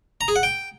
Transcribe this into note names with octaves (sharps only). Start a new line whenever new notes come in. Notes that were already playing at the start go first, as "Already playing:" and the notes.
A#5
G#4
F#5
G5